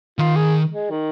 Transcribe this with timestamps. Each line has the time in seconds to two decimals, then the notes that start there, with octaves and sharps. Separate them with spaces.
0.19 D#3 F4
0.36 G#4
0.72 G#3
0.90 D#3